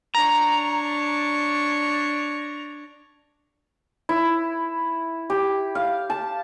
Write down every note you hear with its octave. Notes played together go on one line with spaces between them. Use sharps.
D4 C#5 A#5
E4
G4
F5
A5